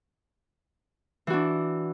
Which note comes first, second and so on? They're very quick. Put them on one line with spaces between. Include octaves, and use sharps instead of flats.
E3 F#4 D4